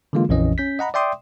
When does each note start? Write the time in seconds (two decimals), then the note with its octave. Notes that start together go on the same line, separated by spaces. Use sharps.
0.13 D3 E3 G#3 A#3 F4
0.29 A#1 F2 E3 C#4 D#5
0.58 C#4 G6 B6
0.79 D#5 F#5 A#5 B5
0.94 D5 E5 G5 C6 D6 D#6